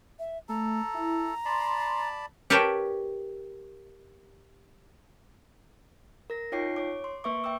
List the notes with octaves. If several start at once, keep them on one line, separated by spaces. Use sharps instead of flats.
E5
A3 A4 A#5
E4
D5 A5 B5 C6
G4 A#4 B4 C#5 G5 A5
A#4 A#6
D#4 F4 C#5 G5 D6 C7
C#5 D6
C6
A#3 B4 E5 C#6 D6
E5 G5 D6 E6